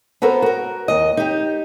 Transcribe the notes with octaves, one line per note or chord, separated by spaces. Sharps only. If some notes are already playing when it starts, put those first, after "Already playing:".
B3 F#4 A4 A#4 C5
F#4 A#4
D#2 D#5
D#4 G4